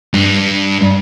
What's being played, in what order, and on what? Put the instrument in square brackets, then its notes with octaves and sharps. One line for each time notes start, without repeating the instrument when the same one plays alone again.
[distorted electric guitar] G2